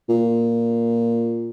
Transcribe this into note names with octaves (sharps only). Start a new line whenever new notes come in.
A#2